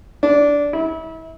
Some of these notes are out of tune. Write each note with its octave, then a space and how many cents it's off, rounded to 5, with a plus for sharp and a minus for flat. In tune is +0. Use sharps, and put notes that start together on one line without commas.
D4 -15
E4 -30